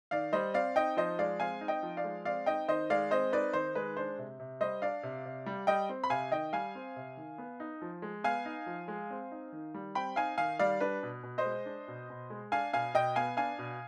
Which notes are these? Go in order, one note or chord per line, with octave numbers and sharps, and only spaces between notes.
D#3 D5 F5
G3 C5 D#5
C4 D5 F5
D#4 D#5 G5
F3 C5 D#5
G#3 D5 F5
C4 F5 G#5
D#4
D#5 G5
F3
D5 F5
G#3
C4 D5 F5
D#4 D#5 G5
D#3 C5 D#5
G#3 D5 F5
C4 C5 D#5
D#4 B4 D5
D#3 C5
G#3 B4
D4 C5
C3
C3
G3 C5 D#5
D4 D5 F5
C3
C3
G3
G3 D#5 G5
C4
B5
C3 F5 G#5
D#3 D#5 G5
G3 F5 G#5
C4
C3
D#3
B3
D#4
F3
G#3
B3 F5 G#5
D#4
F3
G#3
C4
D#4
D#3
G3
C4 G5 B5
D#4 F5 G#5
D#3 F5 G#5
G3 D5 F5
D4 B4
B2
B2
C5 D#5
G#3
D4
B2
B2
G#3
D4 F5 G#5
B2 F5 G#5
B2 D#5 G5
B3 F5 G#5
D4 F5 G#5
B2